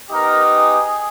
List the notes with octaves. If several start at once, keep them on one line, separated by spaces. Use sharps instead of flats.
B3 D#4 G4 A#4
G#4